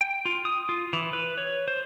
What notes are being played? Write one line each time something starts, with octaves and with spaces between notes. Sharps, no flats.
G5
F4
D#6
F4
E3
B4
C#5
C5